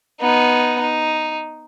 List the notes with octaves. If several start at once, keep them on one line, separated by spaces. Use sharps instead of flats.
B3 D#4
D#4